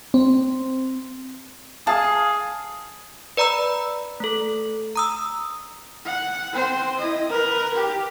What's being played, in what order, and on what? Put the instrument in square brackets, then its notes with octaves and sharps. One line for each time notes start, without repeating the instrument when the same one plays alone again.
[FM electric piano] C4
[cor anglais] G#4 [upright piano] F5 D#6 [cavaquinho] A5
[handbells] B4 D5 A#5 B5 E6
A3 A4
A#5 D#6 E6
[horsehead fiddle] F#5
C4 C5
E4 D#5
A#4 B4
G4